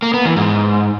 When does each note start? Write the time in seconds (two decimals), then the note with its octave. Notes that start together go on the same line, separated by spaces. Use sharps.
0.02 A#3
0.14 B3
0.25 E3
0.36 G#2